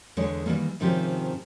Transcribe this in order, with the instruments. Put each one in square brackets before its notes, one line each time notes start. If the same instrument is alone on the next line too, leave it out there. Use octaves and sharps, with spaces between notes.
[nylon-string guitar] E2 D3 G#3 C#5
D#3 E3 G3 A3 A#3
G#2 C3 D#3 F3 C#4 G4